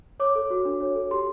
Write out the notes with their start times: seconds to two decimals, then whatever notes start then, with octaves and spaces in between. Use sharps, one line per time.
0.20 C#5 D6
0.35 A4
0.50 F#4
0.65 D4
0.80 C#5
0.95 A4
1.11 G4 C6